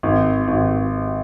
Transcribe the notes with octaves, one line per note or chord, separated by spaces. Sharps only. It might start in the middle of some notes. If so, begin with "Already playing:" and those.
G#1
G#1